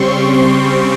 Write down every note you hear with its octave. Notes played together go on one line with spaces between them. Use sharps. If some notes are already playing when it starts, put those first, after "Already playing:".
Already playing: C#3 G3 C4 C6 C#6
C6